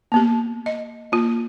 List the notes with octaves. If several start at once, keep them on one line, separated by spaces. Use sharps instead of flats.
A#3 B3 G4
D#5
A#3 F4